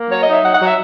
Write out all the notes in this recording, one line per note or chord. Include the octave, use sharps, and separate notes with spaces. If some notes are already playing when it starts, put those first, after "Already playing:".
Already playing: A#3
F#3 C#5
D#5
D#4
E5
F#3 F#5
F#5
F#3
E5